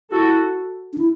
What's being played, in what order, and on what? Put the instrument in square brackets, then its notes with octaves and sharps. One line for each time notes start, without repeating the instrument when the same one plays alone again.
[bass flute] E4 [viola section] F#4 A4
[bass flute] D4
E4